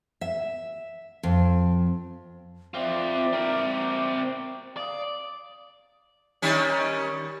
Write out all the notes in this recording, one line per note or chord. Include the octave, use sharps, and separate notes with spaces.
E5
F2
C4 F4 D5 E5 D6
C4 A#4
D5 F5 D#6
D#3 G3 C#4